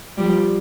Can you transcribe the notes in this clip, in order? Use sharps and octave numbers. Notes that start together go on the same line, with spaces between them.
F3 G3